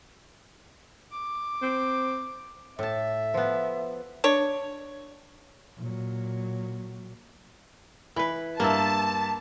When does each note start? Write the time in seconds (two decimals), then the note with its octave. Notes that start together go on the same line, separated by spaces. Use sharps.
1.11 D6
1.61 C4
2.79 A2 E5 A5
3.34 F3 B3
4.24 D4 C#5
5.77 A#2 F#3
8.16 E3 B4 B5
8.60 G2 A#3 E5 A5